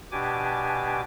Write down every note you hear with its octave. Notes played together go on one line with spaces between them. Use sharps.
B2 D4 G4 G#5 D6